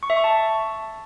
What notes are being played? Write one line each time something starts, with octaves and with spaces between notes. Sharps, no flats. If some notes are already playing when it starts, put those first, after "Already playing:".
C#6
E5
C#6
A5